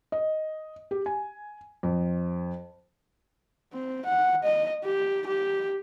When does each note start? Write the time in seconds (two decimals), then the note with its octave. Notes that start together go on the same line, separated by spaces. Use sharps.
0.12 D#5
0.91 G4
1.06 G#5
1.83 F2
3.73 C4
4.06 F#5
4.44 D#5
4.85 G4
5.27 G4